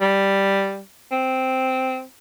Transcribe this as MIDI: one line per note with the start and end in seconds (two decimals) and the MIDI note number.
0.01 0.81 55
1.12 2.03 60